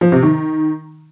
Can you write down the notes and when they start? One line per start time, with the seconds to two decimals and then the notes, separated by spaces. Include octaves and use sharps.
0.01 F3
0.12 C3
0.22 D#3